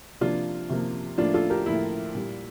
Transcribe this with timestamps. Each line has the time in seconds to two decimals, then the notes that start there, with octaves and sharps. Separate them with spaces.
0.21 C3 F3 A#3 D4 F4
0.70 C3 F3 A#3
1.18 A2 F3 A#3 D4 F4
1.34 F4 A4
1.50 G4 A#4
1.66 A2 F3 A#3 E4
2.15 A#2 G3 A#3